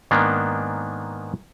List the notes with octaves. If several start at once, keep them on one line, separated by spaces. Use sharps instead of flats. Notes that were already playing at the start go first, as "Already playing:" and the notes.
G#2 D#3 A#3 B3 D4